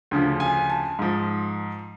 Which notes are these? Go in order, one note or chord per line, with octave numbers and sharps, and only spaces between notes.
D2 C#3 F3
G#5
A5
G#2 F3